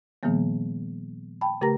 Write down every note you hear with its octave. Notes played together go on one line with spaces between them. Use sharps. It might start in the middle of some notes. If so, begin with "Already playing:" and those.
A#2 D#3 F3 G3 A#3 B3
G5 A5 B5
C#3 A3 G4 A#4 A#5 A#6